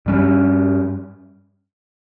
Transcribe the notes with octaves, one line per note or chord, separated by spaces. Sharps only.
G2 G3 C#4